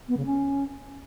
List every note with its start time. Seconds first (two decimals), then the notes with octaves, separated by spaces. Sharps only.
0.08 B3
0.17 C#3
0.26 C#4